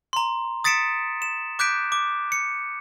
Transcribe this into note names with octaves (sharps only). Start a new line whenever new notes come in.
A#5 C6
D#6 A6 B6 C#7 D7 E7
E7
D6 F#6 G6 B6 D7
D6
C#7